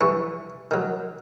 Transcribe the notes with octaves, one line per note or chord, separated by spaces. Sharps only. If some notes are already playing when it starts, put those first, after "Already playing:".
G2 E3 C#6
D#3 F#3